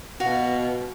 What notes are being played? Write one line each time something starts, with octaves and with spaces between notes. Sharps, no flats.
B2 F#4 F5